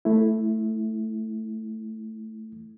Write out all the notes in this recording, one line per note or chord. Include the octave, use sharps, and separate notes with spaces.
A3 E4